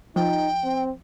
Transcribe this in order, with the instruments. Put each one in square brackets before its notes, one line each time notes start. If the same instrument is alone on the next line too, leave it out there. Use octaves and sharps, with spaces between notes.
[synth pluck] F3 [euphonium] D#4 [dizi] G5
[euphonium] C4